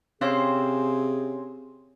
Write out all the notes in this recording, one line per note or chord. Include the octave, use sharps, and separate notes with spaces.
C3 C4 C#4 G#4 C5 C#5 F5 C6